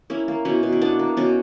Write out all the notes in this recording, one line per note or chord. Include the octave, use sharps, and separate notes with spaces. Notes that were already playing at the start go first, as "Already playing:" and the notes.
A#3 C#4 E4
A#3
B2 C#4 E4
B2
E4
A#3 B3 D4
A#3
B2 C#4